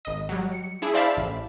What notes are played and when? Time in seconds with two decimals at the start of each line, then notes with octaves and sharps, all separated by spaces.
0.05 G#1 D#5
0.29 F#3 G3
0.52 C#7
0.82 D4 E4 G#4
0.94 C5 D5 E5 F5 A5 B5
1.17 A1